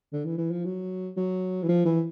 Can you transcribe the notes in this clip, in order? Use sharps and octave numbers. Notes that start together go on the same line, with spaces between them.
D3
E3
E3
F3
F#3
F#3
E3
F3
E3